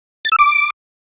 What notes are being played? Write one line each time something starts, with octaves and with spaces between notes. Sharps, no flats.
A6
E6
D6